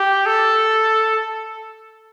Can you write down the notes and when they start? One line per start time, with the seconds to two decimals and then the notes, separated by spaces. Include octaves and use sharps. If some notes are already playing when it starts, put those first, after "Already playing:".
Already playing: G4
0.26 A4